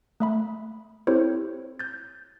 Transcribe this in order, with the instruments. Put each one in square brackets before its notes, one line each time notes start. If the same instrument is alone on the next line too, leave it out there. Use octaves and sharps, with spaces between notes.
[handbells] A3 E5 B5
C4 E4 G4 A4 C5 C#5
G6 A6